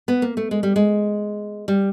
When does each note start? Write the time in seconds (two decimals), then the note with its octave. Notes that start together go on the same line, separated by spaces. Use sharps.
0.08 B3
0.22 A#3
0.37 A3
0.51 G#3
0.63 G3
0.76 G#3
1.68 G3